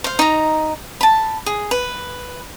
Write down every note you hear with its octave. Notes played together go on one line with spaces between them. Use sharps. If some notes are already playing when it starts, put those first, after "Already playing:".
C5 F5
D#4 A#5
A5 B5
G#4
B4